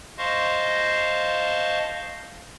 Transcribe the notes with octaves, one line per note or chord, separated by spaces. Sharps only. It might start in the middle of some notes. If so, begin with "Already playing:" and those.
C5 D#5 F5 A5 C6 C#6